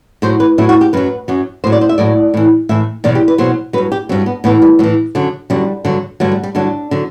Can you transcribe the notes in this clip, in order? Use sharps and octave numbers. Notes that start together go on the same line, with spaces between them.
A2 F#3 C5
B4
A2 F#3 E4
F#4
G4
F#2 F#3 B4
F#2 F#3
A2 F#3 C5
D5
C5
E5
A2 F#3 D5
A2 E3
A2 E3 E5
E2 B2 F#3 D5
G4
B4
E2 B2 F#3 C5
G2 F#3 B4
G4
G2 F#3 C4
B3
A2 E3 B3
G3
A2 E3 F#3
F#2 D3 F#3
F#2 D3 F#3 G3
G2 D3 F#3
G2 D3 F#3 A3
G3
G3
G2 D3 F#3 D4
D3 F#3